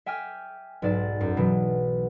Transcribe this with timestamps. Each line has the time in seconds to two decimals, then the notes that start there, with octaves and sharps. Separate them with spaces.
0.06 E5 G5 G#5 D6 F6
0.82 B1 G#2 D5 E7
1.21 F#2
1.37 B2 E3 F#3